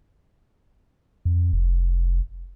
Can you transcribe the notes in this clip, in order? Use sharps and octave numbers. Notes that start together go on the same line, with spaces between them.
F2
F1